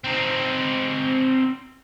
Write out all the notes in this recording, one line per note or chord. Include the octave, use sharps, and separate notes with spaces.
C4 D#4